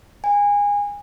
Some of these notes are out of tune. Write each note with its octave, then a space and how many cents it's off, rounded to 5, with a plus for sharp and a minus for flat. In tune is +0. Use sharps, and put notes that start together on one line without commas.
G#5 -25